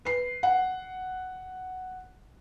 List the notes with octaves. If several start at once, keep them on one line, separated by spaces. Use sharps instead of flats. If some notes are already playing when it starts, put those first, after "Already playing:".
B4 C7
F#5